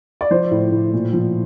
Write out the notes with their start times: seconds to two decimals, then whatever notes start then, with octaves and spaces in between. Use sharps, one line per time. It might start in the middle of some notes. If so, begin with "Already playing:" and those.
0.21 D5
0.31 F3 C5
0.51 A2
0.71 A2
0.93 A#2
1.13 F3